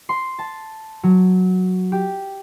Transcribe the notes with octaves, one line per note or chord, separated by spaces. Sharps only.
C6
A5
F#3
G4